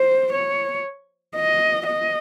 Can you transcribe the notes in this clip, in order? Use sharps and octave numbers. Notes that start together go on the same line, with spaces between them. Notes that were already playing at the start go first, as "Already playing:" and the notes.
Already playing: C5
C#5
D#5
D#5